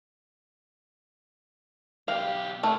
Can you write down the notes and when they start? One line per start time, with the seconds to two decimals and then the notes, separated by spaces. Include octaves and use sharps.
2.08 B1 G4 F5
2.63 B2 A3